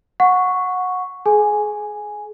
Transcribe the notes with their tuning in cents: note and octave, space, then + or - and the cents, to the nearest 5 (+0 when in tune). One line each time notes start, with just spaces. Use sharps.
F#5 -20 C#6 +0
G#4 +30 G#5 +0